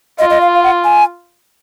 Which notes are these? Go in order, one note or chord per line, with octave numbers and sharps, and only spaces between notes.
F4 D#5
D#5
F5
F5
F#5
G#5